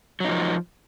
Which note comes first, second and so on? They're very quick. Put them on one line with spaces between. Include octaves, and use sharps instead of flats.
F#3 D#4 F3